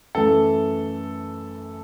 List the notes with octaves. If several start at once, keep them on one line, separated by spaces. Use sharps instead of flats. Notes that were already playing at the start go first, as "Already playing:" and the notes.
F#2 E3 A3 A4